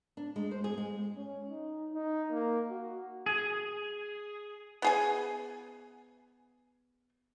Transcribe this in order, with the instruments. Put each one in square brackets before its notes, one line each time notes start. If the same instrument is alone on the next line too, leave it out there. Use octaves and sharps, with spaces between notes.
[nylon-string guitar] D4
G#3
C5
G#4
G#3
[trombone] C#4
D#4
D#4
A#3
F#4
[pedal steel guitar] G#4
[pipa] B3 G#4 G#5